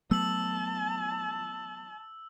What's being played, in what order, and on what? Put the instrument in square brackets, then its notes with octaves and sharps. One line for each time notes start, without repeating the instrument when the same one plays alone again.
[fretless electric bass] F#3 A3 B3 [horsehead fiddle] A5 [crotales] E6 F#7